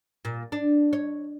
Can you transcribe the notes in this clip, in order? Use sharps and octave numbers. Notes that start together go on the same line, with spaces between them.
A#2
D4
C#5